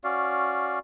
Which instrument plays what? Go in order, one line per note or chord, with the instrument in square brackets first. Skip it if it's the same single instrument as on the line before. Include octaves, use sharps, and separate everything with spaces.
[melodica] C#4 F#4 D5 F5